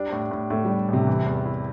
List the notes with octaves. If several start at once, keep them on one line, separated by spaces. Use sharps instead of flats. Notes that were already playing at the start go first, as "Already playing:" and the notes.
Already playing: G3 D4
A2
A2
A2 A3
G3
D4
A1
C3
E3
E2
E4